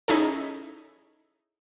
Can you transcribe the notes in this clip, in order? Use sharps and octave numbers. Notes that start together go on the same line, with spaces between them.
C#4 D#4 E4 G#4 A4